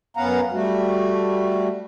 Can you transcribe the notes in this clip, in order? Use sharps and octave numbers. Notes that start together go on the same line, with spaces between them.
F#2 B3 C#4 F5 F#5 A#5
G3 A3 F#4